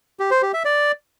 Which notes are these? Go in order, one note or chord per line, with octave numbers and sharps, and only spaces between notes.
G4
C5
G4
E5
D5